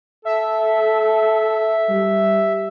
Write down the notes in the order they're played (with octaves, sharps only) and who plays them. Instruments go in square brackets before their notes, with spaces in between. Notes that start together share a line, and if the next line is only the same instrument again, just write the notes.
[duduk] A4 [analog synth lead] E5
[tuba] G3